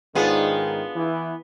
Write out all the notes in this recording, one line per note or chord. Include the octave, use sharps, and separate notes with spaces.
G#2 D#3 B3 D4 F4 G#4
E3 E4